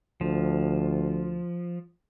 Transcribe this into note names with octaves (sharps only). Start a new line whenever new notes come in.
D2 F3